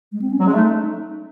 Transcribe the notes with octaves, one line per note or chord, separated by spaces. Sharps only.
G#3
C4
C#4
F#3
G#3 C#4
A3 D#4